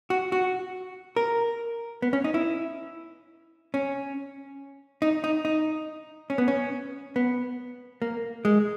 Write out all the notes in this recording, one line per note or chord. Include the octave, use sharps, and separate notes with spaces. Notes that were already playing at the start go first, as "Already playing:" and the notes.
F#4
F#4
A#4
B3
C#4
D#4
E4
C#4
D#4
D#4
D#4
C#4
B3
C#4
B3
A#3
G#3